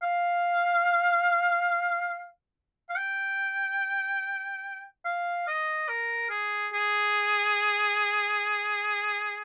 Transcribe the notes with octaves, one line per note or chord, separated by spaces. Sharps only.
F5
F5
G5
F5
D#5
A#4
G#4
G#4